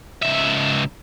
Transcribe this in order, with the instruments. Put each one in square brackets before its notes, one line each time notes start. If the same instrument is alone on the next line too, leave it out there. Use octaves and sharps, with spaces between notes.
[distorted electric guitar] C#2 E5